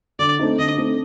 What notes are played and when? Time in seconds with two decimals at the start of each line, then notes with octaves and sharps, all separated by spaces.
0.19 D3 D5
0.39 A3 C4 D#4
0.58 D3 D#5
0.77 A3 C4 D#4